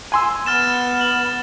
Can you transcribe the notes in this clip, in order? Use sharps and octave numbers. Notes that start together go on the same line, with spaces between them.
G#5 C6 E6
B3 F6 A6 E7
F#7